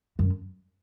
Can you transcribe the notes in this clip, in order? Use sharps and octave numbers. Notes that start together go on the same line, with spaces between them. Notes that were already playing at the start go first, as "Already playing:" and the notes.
F#2